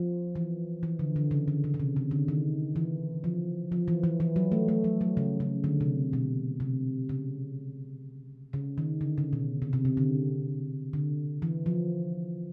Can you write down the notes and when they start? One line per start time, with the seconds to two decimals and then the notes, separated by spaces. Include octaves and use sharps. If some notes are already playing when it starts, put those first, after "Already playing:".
Already playing: F3
0.36 E3
0.83 E3
0.99 D3
1.16 D3
1.31 C#3
1.48 D3
1.64 C#3
1.74 C#3
1.80 C3
1.96 C#3
2.11 D3
2.28 D#3
2.76 E3
3.24 F3
3.72 F3
3.88 E3
4.04 E3
4.20 E3
4.36 F#3
4.52 A3
4.68 A3
4.84 F#3
5.01 F#3
5.17 C#3
5.40 C#3
5.64 D3
5.81 C3
6.13 B2
6.60 C3
7.09 C#3
8.53 C#3
8.78 D#3
9.01 D3
9.18 C#3
9.33 B2
9.62 C3
9.73 C3
9.85 C#3
9.97 D3
10.93 D3
11.42 E3
11.66 F3